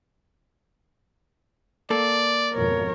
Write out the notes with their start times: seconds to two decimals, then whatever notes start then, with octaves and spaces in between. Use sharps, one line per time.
1.90 A#3 A4 D5
2.54 G#1 F2 B2 A#4 C#5